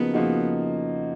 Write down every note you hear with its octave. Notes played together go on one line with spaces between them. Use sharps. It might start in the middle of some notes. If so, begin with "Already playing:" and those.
Already playing: C#3 F3 A#3 B3 D#4 F#4
C#3 F3 A#3 D#4 F#4